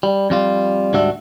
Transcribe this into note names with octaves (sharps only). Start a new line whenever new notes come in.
G3
F2 G3 F4
D2 G#2 G3 D4 F#4 E5